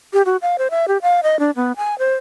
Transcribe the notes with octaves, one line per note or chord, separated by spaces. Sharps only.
G4
F#4
F5
C5
E5
G4
F5
D#5
D4
B3
G#5
C5